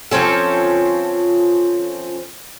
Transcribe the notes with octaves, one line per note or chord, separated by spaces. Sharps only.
F3 C4 C#4 A4